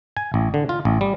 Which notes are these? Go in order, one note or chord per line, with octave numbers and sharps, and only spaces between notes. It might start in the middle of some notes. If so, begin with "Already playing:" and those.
G#5
A1
D3
F4
A1
G3